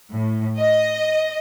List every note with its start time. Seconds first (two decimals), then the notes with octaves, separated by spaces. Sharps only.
0.11 A2
0.59 D#5